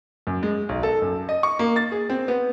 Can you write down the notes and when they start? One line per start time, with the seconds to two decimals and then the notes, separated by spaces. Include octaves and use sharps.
0.27 F#2
0.43 G#3
0.69 B1
0.83 A4
1.02 F#2
1.29 D#5
1.43 C#6
1.59 A#3
1.76 A6
1.92 G#4
2.10 C4
2.28 B3